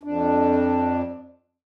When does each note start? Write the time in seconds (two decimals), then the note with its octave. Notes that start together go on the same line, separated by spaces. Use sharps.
0.03 F2 D4